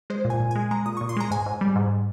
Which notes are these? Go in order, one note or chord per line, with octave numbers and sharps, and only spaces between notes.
G#3 C5
A#2
G#5
A#2
G#3 G#5
G#3 A#5
A#2 D#6
A#2 C#6
C6
G#3 A#5
G#2 G#5
G#2
G3
G#2